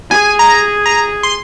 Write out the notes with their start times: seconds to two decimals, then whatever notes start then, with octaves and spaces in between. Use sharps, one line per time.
0.11 G#4 G#5
0.39 A#5
0.86 A#5
1.23 C6